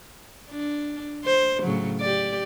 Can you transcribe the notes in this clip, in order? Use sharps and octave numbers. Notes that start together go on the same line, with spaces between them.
D4
C5
A2 C#3 F#3
G4 D5